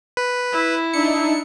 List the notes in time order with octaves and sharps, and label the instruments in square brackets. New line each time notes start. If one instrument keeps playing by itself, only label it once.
[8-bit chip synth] B4
[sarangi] E4
[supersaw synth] D4 D#4 E5 [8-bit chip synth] C#7